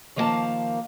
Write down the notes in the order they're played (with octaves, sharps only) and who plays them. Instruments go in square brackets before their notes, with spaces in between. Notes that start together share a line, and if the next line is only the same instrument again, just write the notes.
[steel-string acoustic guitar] D#3 F3 A#3 C#5 F5 A5